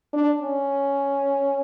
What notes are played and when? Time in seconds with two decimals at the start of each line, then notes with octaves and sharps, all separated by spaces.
0.13 D4
0.42 C#4